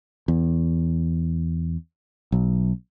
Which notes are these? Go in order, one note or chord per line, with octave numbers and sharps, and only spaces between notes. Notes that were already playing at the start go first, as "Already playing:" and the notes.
E2
B1